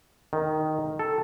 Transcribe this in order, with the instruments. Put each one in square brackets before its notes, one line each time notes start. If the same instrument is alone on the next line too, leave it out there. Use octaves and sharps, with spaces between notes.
[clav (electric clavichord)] D#3
A4